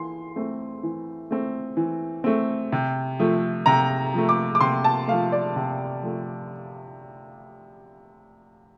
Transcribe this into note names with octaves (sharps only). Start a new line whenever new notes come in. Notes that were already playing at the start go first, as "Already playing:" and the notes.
Already playing: E3 C6
A3 C4
E3
A3 C4
E3
A3 C4
C3
F3 A3
C3 A#5
F3 A3
D6
D6
C3 C6
A5
F3 A3 F5
D5
C3
F3 A3